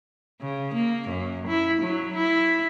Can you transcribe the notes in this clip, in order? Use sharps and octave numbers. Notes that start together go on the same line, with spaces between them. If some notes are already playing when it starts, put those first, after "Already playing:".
C#3
A#3
F#2
E4
F#3
E4